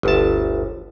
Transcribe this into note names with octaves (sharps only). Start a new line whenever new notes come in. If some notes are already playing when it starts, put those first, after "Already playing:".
G1 D2 A5